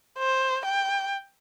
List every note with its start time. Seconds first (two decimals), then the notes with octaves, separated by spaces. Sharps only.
0.18 C5
0.66 G5